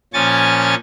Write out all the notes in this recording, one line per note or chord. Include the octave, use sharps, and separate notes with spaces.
A#2 F3 C#4 G#5 C#6 A6